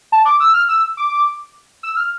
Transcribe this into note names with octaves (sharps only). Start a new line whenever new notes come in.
A5
D6
E6
F6
E6
D6
E6
F6